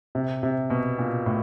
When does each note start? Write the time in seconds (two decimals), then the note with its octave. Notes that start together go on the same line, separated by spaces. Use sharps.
0.15 C3
0.43 C3
0.70 B2
0.98 A#2
1.26 A2